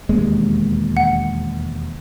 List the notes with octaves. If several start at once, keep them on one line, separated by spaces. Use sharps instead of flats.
E1 D#2 G#3
F#5